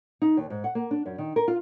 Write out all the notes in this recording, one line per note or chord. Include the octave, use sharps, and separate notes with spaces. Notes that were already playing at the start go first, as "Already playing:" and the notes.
D#4
D#2
G#2
F#5
A#3
D4
F#2
D#3
A#4
F4